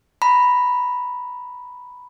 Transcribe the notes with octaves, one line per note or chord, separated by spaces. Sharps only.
A#5 B5